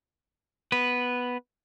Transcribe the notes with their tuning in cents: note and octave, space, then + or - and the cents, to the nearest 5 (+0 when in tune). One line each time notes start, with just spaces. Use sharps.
B3 +0 B4 +0